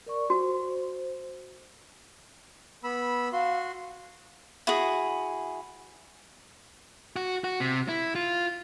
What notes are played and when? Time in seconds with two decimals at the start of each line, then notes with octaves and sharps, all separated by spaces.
0.06 A#4 D5 C#6
0.30 F#4 C5
2.84 B3 B5 E6
3.33 F#4 F5 C6
4.67 E4 F#4 G#4
7.16 F#4
7.44 F#4
7.60 C3
7.89 E4
8.15 F4